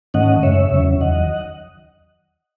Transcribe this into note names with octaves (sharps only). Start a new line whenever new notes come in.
G#2 D#3 A3 C#4 D#5 F#5
D#5
F#2 C#3 G#3 C#5 E5
E2 C#3 F#3 C#4
E2 D#3 F#3 D#5 F#5